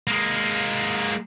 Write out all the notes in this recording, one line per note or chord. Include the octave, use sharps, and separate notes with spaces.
G#3 A#3